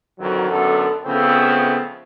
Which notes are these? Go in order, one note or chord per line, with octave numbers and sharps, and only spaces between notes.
F2 D3 D#3 F#3
F#2 D3 B3 A4
C#3 F3 A3 B3 C4